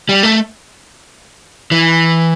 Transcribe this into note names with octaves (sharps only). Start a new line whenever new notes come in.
G3
A3
E3